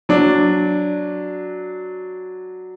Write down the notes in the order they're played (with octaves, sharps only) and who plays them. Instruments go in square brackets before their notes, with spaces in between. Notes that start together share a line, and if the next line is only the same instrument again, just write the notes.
[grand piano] F#3 D4